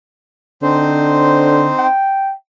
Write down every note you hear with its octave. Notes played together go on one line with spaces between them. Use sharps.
D3 C4 D#4 C5
G5